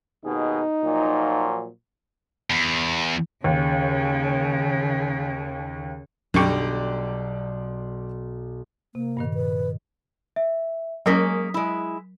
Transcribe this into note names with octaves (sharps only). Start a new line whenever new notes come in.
D#2 B2 D#4 G#4
A#2 F3 F#3
E2
D#2 C#3
B1 F#2 D3 G3 D5 G5 A#5 C#6
C3 A#3
G2 A#2 D#3
B4
E5
F#3 G#3 A#3 C#4 A#4 D#6 B6
G#3 E4